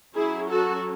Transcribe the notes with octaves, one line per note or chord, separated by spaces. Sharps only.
F#3 C#4 E4 G#4
F#4 A4